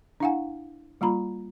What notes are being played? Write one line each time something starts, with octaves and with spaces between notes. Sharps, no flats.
D4 E4 F5 F#5 G#5
G3 A#3 F4 A#5 B5